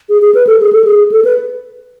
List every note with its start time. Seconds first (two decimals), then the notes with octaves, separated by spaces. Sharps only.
0.09 G#4
0.22 G#4
0.35 B4
0.47 A4
0.60 G#4
0.73 A4
0.84 G#4
1.12 A4
1.25 B4